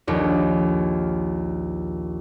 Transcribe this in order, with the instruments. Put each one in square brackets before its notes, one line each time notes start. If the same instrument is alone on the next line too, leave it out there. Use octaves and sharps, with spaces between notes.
[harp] A#1 D#2 C#5